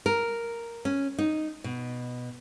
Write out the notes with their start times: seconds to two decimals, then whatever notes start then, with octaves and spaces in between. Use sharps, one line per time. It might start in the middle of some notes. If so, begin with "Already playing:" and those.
0.06 A#4
0.85 C#4
1.18 D#4
1.64 B2